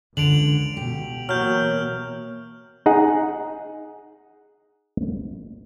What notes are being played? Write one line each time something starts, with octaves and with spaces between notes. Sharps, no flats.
C#2 D3 D7 F7 F#7
B2 G4
B2 E3 F#3 A#3 F6 G6
D#4 G#4 F#5